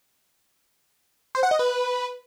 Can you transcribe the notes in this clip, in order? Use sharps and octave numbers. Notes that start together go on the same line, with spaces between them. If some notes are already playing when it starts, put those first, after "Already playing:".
C5
F#5
D#5
B4